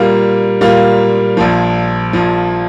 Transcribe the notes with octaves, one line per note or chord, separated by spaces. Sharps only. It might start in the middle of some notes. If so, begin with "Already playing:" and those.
Already playing: A#2 G3 A#3 F4
A#2 G3 A#3 F4
A#1 A#2 F3
A#1 A#2 F3